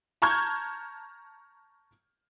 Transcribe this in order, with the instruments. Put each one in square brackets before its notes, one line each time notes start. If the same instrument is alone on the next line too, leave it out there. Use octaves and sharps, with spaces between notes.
[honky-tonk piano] A5 A#5 C#6 F6 G6 G#6